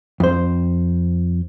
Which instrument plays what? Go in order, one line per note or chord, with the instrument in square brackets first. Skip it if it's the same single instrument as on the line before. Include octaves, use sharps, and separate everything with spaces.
[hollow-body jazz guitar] F2 C5